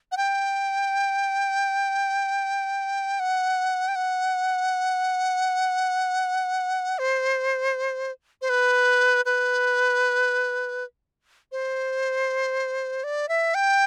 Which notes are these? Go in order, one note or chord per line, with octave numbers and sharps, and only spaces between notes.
F#5
G5
F#5
G5
F#5
C5
C5
B4
B4
C5
D5
E5
G5